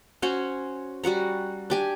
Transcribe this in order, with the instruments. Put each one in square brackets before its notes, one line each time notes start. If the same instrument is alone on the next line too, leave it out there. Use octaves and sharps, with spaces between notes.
[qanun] C#4 F#4 C5 C#5
G3 F#4 F#5 A#5
D4 G4 G#5